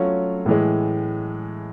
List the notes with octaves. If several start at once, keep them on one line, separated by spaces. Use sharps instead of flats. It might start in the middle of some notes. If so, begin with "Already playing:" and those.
Already playing: F#3 A3 C#4 F4
A2 E3 G#3